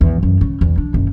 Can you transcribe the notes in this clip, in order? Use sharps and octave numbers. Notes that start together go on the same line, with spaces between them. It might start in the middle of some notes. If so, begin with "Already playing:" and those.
E2
F#2
C#3
E2
D4
F#1